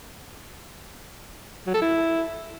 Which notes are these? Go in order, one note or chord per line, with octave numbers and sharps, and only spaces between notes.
F#3
A4
E4